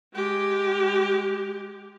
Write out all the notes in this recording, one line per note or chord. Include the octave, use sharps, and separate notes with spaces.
G#3 G4